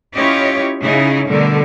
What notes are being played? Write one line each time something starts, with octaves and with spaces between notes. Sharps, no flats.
C#4 E4 F4 G4 C#5 D#5
C#3 D#4 E4 G#4
B2 D3 G3 A3 A4 A#4